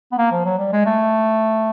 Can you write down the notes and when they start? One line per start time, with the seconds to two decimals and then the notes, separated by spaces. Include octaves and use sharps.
0.12 B3
0.18 A#3
0.32 F3
0.45 F#3
0.58 G3
0.73 G#3
0.86 A3